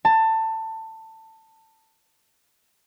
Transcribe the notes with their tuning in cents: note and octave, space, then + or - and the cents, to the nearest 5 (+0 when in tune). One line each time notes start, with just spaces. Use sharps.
A5 +20